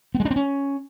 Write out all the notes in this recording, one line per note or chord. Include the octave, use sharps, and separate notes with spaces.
B3
G#3
D4
C4
C#4